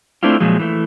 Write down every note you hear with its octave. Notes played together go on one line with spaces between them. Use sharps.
A3 C4 D4 E4 F4
A#2 F3 F#3 G#3
E3 A3